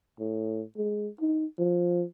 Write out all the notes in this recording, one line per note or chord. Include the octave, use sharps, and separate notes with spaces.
A2
G#3
D#4
F3